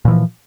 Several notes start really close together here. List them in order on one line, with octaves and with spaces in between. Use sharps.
A#2 E3 F3